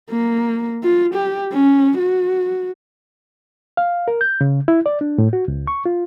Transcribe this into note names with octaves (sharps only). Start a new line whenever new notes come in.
A#3
F4
G4
C#4
F#4
F5
A#4
G6
C#3
E4
D5
D4
A2
F#4
C#2
C#6
F4